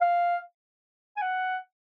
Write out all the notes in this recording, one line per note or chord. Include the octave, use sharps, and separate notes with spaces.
F5
G#5
F#5